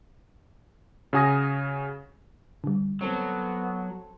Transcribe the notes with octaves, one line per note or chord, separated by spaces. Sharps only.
C#3 F#4 G#5 D#6 A#6
D3 G3
F#3 B3 C4 A4